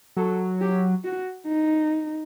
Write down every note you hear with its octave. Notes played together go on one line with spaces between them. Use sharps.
F#3 A4
G4
F#4
D#4